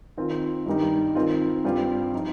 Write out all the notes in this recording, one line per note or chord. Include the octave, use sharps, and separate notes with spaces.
D#3 C4 F4
G2 D#3 G3 D#4
D#3 C4 F4
G2 G3 C4 F4
F3 D#4